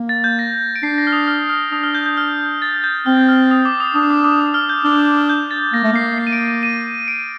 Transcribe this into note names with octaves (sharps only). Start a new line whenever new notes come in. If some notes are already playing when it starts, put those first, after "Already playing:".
Already playing: A#3
A6
G6
A#6
D7
D4 C7
A#6
F6
D#6
F6
F6
D4 D#6
F6
G6
G6
F6
A6
G6
C4 F6
F6
D#6
D6
D#6
D4 D#6
D6
D6
D#6
F6
G6
D4 F6
F6
G6
A6
A#3 A#6
A3
A#3 C7
C7
D#7
D7
D#7
D#7
D7